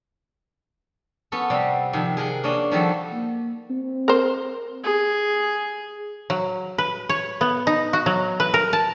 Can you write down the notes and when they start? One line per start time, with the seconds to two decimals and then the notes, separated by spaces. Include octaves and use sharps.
1.32 B3 C#4 A4
1.50 C3 G3
1.93 C3 D#3 F3
2.17 G#4 A#4 D#5 F#5
2.44 A#3 C#4 D4 D#5
2.71 D#3 F3 G3 C4 F#4 A4
3.12 A#3
3.70 C4
4.08 A#4 C5
4.84 G#4
6.30 F#3
6.78 B4
7.09 C#5
7.41 B3
7.67 D#4
7.93 F#4
8.06 F#3
8.40 B4
8.54 A#4
8.73 A5